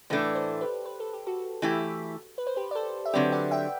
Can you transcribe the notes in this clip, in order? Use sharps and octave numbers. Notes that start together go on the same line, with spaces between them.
A2 E3 A3 D4 B4 D5
A4 C5
G4 B4
B4
A4
G4
F#4 A4
E3 A3 E4 G4
B4
C5
G4 B4
D5
A4 C5
E5
D3 F#3 C4 G4 B4 D5
D5 F#5
E5 G5